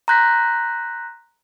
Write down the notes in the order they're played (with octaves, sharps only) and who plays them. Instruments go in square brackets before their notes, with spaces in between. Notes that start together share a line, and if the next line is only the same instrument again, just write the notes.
[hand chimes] A#5 C6 F#6 G6 A#6 B6